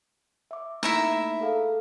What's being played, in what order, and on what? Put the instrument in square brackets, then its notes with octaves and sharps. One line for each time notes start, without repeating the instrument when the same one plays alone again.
[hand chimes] E5 D6
[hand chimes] A3 A#3 D#4 [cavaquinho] E4 E5 A#5
[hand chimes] G#4 A4 F5